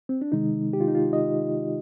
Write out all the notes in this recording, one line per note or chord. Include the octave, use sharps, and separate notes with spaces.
C4
D4
C3 D#3 G#3 D#4
G4
F4
D#4
F4
D#5